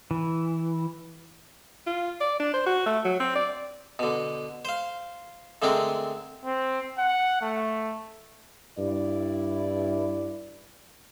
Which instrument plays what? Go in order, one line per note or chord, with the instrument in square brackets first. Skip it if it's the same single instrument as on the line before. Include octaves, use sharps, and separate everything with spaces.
[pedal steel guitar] E3
[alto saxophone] F4
D5
D4
C5
F#4
A3
F#3
C4
D5
[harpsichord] B2 D3
C5 F5
D3 G#3 A3 C4 G#4 A#4
[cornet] C4
F#5
A3
[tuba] G2 [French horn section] E4 D5